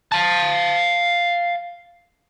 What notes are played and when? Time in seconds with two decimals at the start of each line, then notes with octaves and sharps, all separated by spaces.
0.12 F5 A5